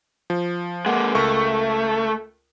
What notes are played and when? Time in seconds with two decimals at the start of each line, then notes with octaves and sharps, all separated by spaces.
0.30 F3
0.86 G#3 A#3 F#5
1.15 C#2 A3 A#4 C#6